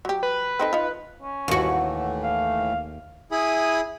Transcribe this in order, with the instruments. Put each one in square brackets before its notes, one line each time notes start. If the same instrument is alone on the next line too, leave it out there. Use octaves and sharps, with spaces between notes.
[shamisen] F#3 G4
[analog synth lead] B4
[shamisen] C4 D#4 A4
D#4 F4
[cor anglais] C#4
[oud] D#2 F#4 [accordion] A2 E3 A3
[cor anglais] F5
[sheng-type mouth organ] E4 G#4 G#5 B5 D#6